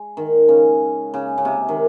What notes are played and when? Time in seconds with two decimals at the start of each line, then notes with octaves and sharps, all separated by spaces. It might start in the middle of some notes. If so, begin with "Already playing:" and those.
Already playing: G#3
0.17 D#3
0.48 C#3
1.14 C#3
1.38 C#3
1.45 C3
1.68 D#3